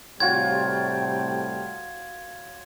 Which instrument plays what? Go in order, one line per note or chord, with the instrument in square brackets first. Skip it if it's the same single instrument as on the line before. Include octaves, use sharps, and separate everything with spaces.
[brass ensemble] A2 C3 G3 [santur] F4 F#4 C#5 [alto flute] G5 [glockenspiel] G#6